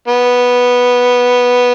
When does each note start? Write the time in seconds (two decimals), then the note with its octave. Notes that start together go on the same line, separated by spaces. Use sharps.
0.08 B3